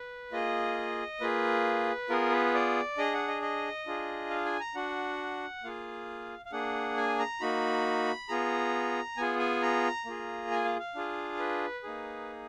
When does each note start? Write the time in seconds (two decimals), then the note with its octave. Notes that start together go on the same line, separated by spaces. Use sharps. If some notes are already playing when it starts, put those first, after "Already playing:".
Already playing: B4
0.32 A#3 F4 G#4 D#5
1.20 A#3 F4 G#4 B4
2.09 B3 F4 G#4 A#4
2.32 B4
2.54 D5
2.98 D4 G#4 D#5
3.13 F#5
3.28 D#5
3.42 D#5
3.87 D4 F4 G#4
4.30 F5
4.45 G#5
4.60 A#5
4.75 D4 F#4 F#5
5.64 A#3 F4 G#4 F5
6.46 F5
6.52 A#3 D4 G#4 F#5
6.97 G#5
7.19 A#5
7.40 A#3 D#4 F#4 B5
8.28 B3 F4 G#4 A#5
9.17 B3 F4 G#4 G#5
9.39 G#5
9.62 A#5
10.05 A#3 F4 G#4
10.51 G#5
10.64 F5
10.79 F5
10.95 D4 F4 G#4
11.39 B4
11.83 A#3 D#4 G#4